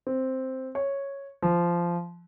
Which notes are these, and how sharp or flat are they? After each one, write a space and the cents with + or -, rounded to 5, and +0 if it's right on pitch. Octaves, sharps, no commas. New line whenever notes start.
C4 +0
C#5 -5
F3 -15